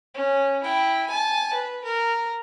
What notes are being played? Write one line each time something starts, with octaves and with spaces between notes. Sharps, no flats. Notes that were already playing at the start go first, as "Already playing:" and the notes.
C#4
E4 G5
G#5 A5
B4
A#4